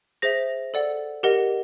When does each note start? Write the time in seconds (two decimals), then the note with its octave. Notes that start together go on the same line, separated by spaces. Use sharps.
0.22 G#4 C5 E5 A#6
0.74 A4 D5 F#5
1.23 G4 A#4 D#5 F#5